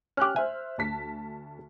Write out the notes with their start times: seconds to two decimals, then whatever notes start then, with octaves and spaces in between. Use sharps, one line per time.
0.17 C#4 G4 F6 F#6
0.36 C5 E5 G#5
0.78 D2 A5 B6